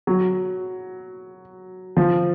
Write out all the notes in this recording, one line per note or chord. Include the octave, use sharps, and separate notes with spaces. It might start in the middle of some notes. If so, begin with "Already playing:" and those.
F#3
F3